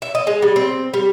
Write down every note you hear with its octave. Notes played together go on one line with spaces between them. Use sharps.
E5
D#5
G#3
G3
C4
G3